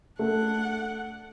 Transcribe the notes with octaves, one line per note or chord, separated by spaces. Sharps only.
A3 D4 F#5